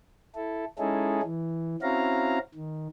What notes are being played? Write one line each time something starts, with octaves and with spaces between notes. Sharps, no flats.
E4 A4
G#3 C#4 D#4 E4 G#4 A4
E3
C4 C#4 E4 F#4 F5 A#5
D#3